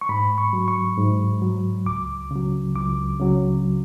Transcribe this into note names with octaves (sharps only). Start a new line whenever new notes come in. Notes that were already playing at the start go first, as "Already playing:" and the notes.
C#6
G#2 B5
C#6
F#3
C#6
G#2
F#3
C#2 D6
C#3 F#3
C#2 D6
C#3 F#3